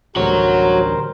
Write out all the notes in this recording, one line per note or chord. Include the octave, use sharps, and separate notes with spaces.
A1 D2 G3 F#4 A#4 C5 C#5